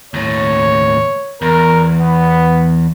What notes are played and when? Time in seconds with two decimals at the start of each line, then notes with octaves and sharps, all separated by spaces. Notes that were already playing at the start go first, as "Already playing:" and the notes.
0.14 D#2 A2 C#5
1.42 E2 A#4
1.98 B3